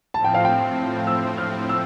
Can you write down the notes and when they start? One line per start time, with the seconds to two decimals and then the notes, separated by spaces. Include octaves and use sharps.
0.14 A2 F3 C4 A5
0.24 G5
0.34 F5
0.45 G5
1.07 E6
1.38 F6
1.69 E6